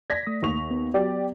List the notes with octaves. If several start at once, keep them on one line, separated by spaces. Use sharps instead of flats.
D5 G#6 A#6 B6
A3 D#6
D#2 C#6 F7
B3
F#3 G4 D5